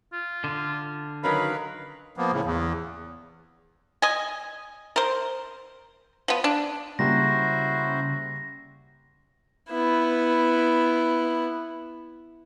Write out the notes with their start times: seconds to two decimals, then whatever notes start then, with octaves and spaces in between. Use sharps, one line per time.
0.13 F4
0.44 D3
1.24 D#3 F#3 C#4 A#4 B4 F5 B5
2.17 F3 A#3 B3
2.32 A2 C#3
2.45 E2
4.02 D#5 G#5
4.96 A#4 C5
6.28 F3 B3
6.44 D4
6.99 C#3 G3 A#3 E4 F#4 C5 A#6
9.69 B3 E4